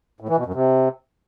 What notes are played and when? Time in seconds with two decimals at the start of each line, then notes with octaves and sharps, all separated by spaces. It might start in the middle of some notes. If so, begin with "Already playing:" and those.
0.20 A2
0.29 E3
0.37 B2
0.45 F#2
0.54 C3